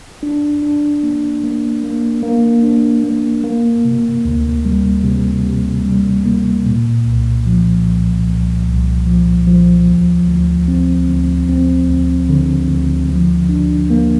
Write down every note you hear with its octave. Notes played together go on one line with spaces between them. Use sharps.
D4
D4
A#3
A#3
A#3
A#3
D4
A#3
A#3
C3
D2
G3
C3
C3
G3
A#3
A#2
C2
F3
C2
C2
C2
F3
F3
D2
D2
C4
D2
C4
D2
D3
D2
F3
D4
A#3